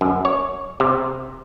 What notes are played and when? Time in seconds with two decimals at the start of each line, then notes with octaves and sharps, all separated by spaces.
0.01 F#2
0.25 C#5
0.80 C3